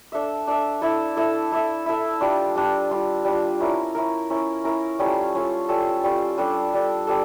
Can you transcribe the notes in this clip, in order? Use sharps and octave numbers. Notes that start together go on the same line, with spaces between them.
D4 A4 E5
D4 A4 E5
E4 A4 E5
E4 A4 E5
E4 A4 E5
E4 A4 E5
G3 D4 F4
G3 D4 F4
G3 D4 F4
G3 D4 F4
C#4 E4 A#4
C#4 E4 A#4
C#4 E4 A#4
C#4 E4 A#4
G3 C#4 F4 A4
G3 C#4 F4 A4
G3 C#4 F4 A4
G3 C#4 F4 A4
G3 D4 A4
G3 D4 A4
G3 D4 A4